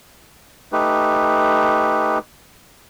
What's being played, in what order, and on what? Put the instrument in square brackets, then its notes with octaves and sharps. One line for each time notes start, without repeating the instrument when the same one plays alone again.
[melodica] A3 D#4 G4 B4